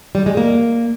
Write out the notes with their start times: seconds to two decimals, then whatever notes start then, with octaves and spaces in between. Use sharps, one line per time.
0.15 G3
0.26 G#3
0.37 A#3